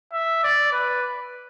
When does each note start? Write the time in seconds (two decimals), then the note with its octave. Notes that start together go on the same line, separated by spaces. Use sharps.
0.13 E5
0.44 D5
0.73 B4